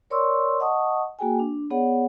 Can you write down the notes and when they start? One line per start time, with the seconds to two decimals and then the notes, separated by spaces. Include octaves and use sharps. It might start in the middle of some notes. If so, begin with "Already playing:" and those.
0.10 A#4 C#5 D5 C6 C#6 E6
0.60 D#5 F#5 A5 C#6 D#6
1.19 A#3 F#4 G#4 G5 G#5
1.39 D4
1.70 B3 G#4 C#5 D5 F#5